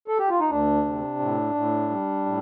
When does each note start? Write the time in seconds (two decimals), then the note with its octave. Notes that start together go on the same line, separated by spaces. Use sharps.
0.08 A4
0.19 G4
0.29 F4
0.40 D#4
0.49 D2 D4
0.85 C3
1.20 A2
1.55 A2
1.90 G3
2.26 A2